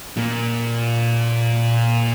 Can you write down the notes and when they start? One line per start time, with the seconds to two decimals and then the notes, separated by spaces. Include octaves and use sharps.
0.17 A#2 A#3